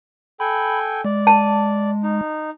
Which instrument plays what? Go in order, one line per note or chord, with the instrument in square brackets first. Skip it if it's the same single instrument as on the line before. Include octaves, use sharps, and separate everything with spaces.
[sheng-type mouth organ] A4 G5 G#5 [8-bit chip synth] B5
[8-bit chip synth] G#3 [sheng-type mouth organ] D5
[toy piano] A5
[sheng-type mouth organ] D#4